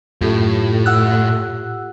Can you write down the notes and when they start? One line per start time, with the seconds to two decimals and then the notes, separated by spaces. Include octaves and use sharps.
0.21 F#2 A2 F4 G4 A4
0.86 F#5 E6 F#6